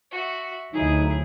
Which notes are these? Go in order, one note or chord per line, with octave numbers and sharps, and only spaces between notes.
F#4 E5
D2 F#3 D#4 E4 G#4